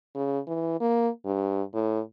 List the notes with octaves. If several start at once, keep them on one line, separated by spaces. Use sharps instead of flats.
C#3
E3
A#3
G2
A2